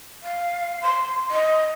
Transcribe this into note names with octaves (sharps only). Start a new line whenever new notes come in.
F5
C6
D#5